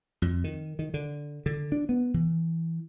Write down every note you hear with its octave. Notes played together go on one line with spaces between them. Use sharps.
F2
D#3
D#3
D3
D3
D4
B3
E3